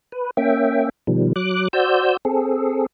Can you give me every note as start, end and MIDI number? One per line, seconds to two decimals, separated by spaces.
0.12 0.31 71
0.37 0.89 58
0.37 0.89 61
0.37 0.89 76
0.37 0.89 79
1.07 1.33 47
1.07 1.33 51
1.07 1.33 53
1.07 1.33 55
1.36 1.68 54
1.36 1.68 86
1.36 1.68 90
1.73 2.17 66
1.73 2.17 72
1.73 2.17 74
1.73 2.17 88
1.73 2.17 91
2.25 2.86 60
2.25 2.86 68
2.25 2.86 69